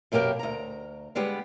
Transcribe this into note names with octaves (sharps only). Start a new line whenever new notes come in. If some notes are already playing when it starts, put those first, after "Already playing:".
F#2 B2 A#3 G4 A#4 G5
D2 A#5
D3 G3 G#3 B3 G4